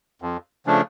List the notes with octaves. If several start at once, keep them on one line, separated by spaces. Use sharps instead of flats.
F2
C#3 F3 A3 D4